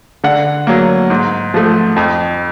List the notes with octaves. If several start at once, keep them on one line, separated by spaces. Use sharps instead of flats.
D3 F#5
F#3 A#3
G#2
F3 A3
F2